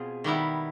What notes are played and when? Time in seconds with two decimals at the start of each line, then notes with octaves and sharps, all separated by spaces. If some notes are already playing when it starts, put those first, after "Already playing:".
Already playing: B2 C4 F4 G#4
0.24 D#3 G3 B3 E4